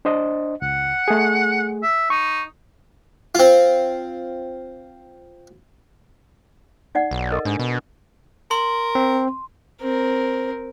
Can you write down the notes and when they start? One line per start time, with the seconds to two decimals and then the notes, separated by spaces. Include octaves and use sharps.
0.05 D4 C5 D#5
0.62 C#2 F#5
1.08 A3 G#4
1.83 E5
2.10 D#4 C#6
3.35 C4 F4
6.95 D#4 D5 F#5
7.11 B1
7.31 A4 A#4 D#5
7.45 G#2 D4 D#6
7.59 B2
8.51 A#4 C6
8.95 C4
9.81 C4 A#4